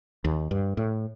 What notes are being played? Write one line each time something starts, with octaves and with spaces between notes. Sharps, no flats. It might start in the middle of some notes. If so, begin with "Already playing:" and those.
D#2
G2
A2